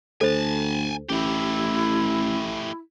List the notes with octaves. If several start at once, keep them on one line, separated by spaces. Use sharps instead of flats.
D2 A4 C5 G#5 A5
A1 A3 E4 G4